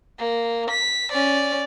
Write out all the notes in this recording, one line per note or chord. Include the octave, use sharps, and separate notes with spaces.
A#3
B6
C#4 D5